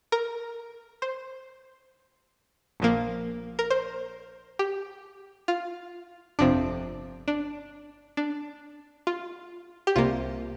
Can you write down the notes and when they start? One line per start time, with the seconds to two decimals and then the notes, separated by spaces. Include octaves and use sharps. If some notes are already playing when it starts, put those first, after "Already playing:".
0.12 A#4
1.02 C5
2.80 A#1 A#2 F3 A#3
3.59 A#4
3.71 C5
4.59 G4
5.48 F4
6.39 G1 F2 C3 F3 C4 D4
7.28 D4
8.17 D4
9.07 F4
9.87 G4
9.96 C2 C3 A#3 F4